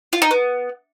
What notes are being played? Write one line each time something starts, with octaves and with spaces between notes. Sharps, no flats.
F4
D#4
B3